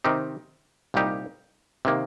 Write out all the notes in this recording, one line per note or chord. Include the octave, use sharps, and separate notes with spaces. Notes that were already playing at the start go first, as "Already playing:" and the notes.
C3 D#3 C4 D#4 G4
C2 A#2 G3 D#4 G4
C3 D#3 A#3